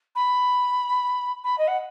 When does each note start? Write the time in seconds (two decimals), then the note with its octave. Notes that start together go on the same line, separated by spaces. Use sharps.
0.15 B5
1.43 B5
1.58 D#5
1.67 F#5